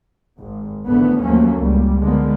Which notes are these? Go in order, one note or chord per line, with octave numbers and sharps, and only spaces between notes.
G#1
G#1 G#2 D3 E3 A3 B3
D#2 F3 F#3 A3 A#3 C#4
C#2 A#2 G3
D3 F3 G#3 A#3 B3